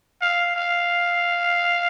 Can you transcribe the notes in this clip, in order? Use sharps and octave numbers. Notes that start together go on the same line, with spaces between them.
F5
F5